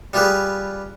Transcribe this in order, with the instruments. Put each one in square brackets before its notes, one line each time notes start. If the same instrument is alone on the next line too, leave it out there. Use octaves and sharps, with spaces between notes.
[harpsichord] G3 F4 G4 G#4 B4